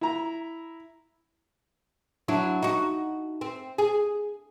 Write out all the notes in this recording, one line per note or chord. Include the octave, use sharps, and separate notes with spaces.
E4 A#5
F#3 D4 E4
D#4 F#4
C4
G#4